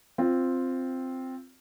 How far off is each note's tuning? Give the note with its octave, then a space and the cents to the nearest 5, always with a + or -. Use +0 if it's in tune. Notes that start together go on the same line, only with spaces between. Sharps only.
C4 +0 F4 +0